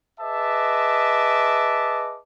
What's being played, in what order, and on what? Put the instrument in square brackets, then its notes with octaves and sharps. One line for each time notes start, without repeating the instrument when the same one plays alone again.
[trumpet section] G#4 B4 D#5 E5 A5 D6